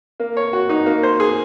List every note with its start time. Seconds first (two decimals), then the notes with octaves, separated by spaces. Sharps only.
0.20 A#3
0.37 C#5
0.53 F#4
0.69 D#4
0.86 A#3
1.03 C5
1.20 G#4